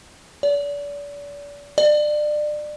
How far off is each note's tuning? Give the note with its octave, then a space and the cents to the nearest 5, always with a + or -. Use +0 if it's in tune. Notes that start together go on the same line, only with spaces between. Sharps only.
D5 -35
D5 +30